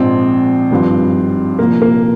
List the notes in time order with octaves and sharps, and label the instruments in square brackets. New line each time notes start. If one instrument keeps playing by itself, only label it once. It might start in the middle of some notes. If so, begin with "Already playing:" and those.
Already playing: [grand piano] A#1 G#2 F3 C4
G#1 G2 F3
C2 A#2 F3 A#3
A#3